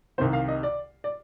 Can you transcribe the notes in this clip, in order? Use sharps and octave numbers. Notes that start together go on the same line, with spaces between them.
C2 C3 D#3 C5
F5
D#5
D5
D5